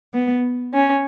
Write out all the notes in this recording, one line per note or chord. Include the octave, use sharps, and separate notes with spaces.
B3
C#4